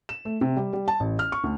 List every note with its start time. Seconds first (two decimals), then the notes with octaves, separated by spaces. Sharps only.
0.09 E7
0.25 A3
0.41 C3
0.57 G3
0.73 G3
0.88 A5
1.00 A1
1.19 F6
1.32 C#6
1.44 D2